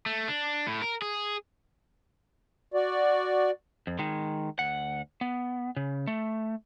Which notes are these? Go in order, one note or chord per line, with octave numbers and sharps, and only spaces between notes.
A3
D4
A2
A#4
G#4
F#4 D5
F2
D#3 G#3
D2 F#5
B3
C#3
A3